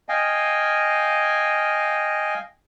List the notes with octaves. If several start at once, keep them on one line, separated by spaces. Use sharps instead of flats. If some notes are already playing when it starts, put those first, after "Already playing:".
D#5 F5 G5 G#5